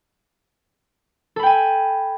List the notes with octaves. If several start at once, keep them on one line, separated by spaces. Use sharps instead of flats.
A4 G5 G#5 B5